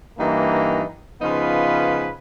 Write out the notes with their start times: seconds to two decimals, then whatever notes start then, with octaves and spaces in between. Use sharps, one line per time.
0.18 G2 E3 A#3 D#4 A#5
1.21 C#3 F3 B3 D#4 F4 B4